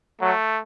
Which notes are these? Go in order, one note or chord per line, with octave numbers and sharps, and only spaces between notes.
F#3 A3